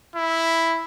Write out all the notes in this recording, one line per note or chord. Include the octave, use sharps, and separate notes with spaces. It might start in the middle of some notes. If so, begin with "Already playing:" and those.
E4